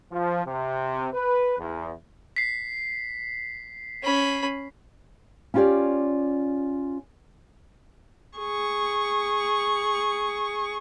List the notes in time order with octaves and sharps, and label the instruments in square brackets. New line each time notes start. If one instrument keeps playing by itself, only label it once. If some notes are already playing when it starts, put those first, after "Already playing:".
[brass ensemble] F3
C3
B4
E2
[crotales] B6 C7
[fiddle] C#4 B5
[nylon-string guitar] C#4 E4 F4 G4 C#5 D5
[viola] G#4 C#6